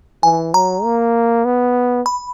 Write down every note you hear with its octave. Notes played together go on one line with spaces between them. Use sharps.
E3 G#5
F#3 A#5
A#3
B3
B5